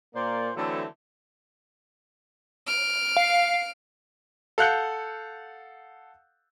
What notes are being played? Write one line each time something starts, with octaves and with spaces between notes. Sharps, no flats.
A#2 A#3 C5 D5
D3 E3 F#3 A3 C4 E4
F6 D7
F5
A4 F5 F#5 F#6 G6 C#7